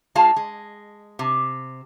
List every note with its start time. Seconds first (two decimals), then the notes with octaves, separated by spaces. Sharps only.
0.15 G#3 F4 F5 A5
0.36 G#3
1.19 C3